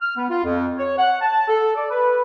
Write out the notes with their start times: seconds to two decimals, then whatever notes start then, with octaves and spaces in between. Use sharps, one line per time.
0.02 F6
0.17 B3
0.30 F4
0.44 F2
0.78 C#5
0.97 F#5
1.21 A5
1.48 A4
1.76 D5
1.90 B4